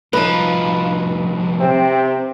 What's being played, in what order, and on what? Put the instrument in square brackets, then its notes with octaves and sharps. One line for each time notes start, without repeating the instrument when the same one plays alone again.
[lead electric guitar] C2 F3 [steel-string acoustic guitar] D#4 B4
[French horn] C3 [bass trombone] C4